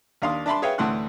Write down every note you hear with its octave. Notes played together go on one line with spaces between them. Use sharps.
D#2 D4 F5 C6 D#6
D4 E5 A5 B5 C6
G#4 B4 C#5 E5 F5 G5
D2 A2 E3 F#5 C6 F#6